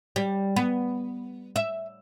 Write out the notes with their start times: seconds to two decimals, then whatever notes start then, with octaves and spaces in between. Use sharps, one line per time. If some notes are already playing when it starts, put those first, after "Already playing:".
0.16 G3
0.56 B3
1.56 E5